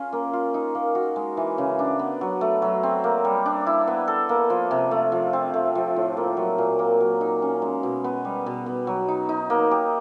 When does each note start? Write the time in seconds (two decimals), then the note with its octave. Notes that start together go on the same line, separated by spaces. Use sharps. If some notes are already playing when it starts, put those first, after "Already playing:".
Already playing: C#4 F4 G#4
0.13 A#3
0.33 F4
0.54 D#4
0.75 A#3
0.95 F#4
1.16 G#3
1.37 E3
1.58 C#3
1.79 D4
1.99 B3
2.21 F#3
2.41 A3
2.62 F#3
2.83 C4
3.04 A#3
3.25 G3
3.46 D4
3.66 E4
3.87 B3
4.08 A4
4.29 A#3
4.50 F3
4.71 C3
4.91 A3
5.12 F3
5.33 C4
5.54 A3
5.75 F3
5.96 A2
6.17 A#3
6.37 F#3
6.58 A#2
6.79 A#3
7.01 F#3
7.21 D#4
7.42 C#4
7.62 G#3
7.83 B2
8.04 B3
8.25 G3
8.46 B2
8.66 B3
8.87 F#3
9.08 D#4
9.29 D#4
9.50 A#3
9.71 G4